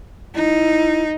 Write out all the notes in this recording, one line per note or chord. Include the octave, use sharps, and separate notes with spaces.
D#4 E4